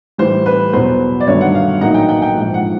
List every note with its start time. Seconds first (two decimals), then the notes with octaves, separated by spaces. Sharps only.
0.18 A2 E3 G3 C5
0.46 B4
0.73 E2 B2 F#3 B3 C5
1.20 D5
1.27 G1 G2 D#3 F#3 A3 C#5
1.41 F#5
1.55 F5
1.81 A#1 A2 F#3 A#3 D#4 F#5
1.94 G5
2.09 G5
2.22 G5
2.36 A#1 G#2 F3
2.54 F#5